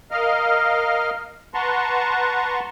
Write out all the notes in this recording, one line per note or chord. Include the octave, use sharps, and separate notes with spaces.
A#4 D#5 F5 F6
B4 F#5 A5 A#5 C6 C#6